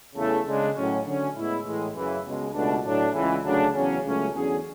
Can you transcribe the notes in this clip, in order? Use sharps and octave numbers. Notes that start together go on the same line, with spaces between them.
E2 C#3 E3 A3
C#3 G#3 D4
A2 F#3 C#4
D3 F#3 C#4
A2 G#3 B3 E4
A2 E3 G#3
F#2 C#3 E3
C#2 B2 G#3
C#2 B2 A3 D4
A2 F#3 A3 D4
C#2 C#3 E3
D2 C#3 F#3 A3 D4
E2 C#3 F#3 C#4
C#2 C#3 F#3 A3 C#4
E2 D3 F#3 C#4 G#4